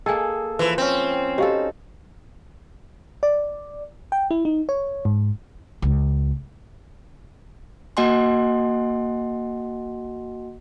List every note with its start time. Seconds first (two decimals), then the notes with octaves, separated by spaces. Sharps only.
0.06 A#3 G#4 A4 D#5 G5 G#5
0.59 E3 F3 E4 B4
0.78 C4 C#4 C5
1.38 D#4 F#4 G4 A4 F5
3.23 D5
4.12 G5
4.31 E4
4.45 D#4
4.69 C#5
5.05 G#2
5.82 C#2
7.97 A#3 F#4 D#5 F#5 G#5 C6